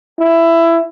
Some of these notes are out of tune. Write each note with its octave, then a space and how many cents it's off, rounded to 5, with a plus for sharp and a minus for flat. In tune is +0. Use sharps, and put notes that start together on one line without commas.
E4 +15